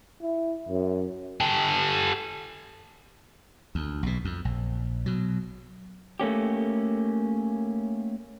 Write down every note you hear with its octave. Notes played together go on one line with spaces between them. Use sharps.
E4
F#2
G4 A4
D2
B1 B2
F2
A#1
B2 F#3
A3 A#3 C#4 G4